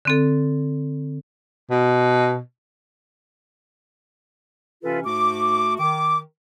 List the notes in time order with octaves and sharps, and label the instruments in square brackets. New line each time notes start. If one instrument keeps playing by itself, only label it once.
[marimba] D3 C4 A4
[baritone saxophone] B2
[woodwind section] C3 E3 C#4 F4 A4 B4
G#2 A3 F#4 D6
D#3 D6